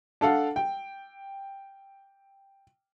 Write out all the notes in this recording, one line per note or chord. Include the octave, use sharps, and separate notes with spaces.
D4 A4 F5 F#5
G5